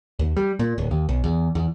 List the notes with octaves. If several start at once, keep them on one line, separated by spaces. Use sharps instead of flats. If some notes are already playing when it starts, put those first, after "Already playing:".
D#2
G3
A#2
D1
D#2
B1
E2
E2